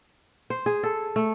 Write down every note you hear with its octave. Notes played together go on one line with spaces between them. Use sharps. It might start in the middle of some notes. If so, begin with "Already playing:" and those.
C5
G#4
A4
A3